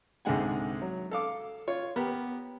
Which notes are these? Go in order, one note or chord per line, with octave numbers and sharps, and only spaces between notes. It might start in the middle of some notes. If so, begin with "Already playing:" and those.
C2 G#2 D3 G#3 F#5 G#5
F#3
A4 F5 D6
F4 C#5
B3 G4 A#4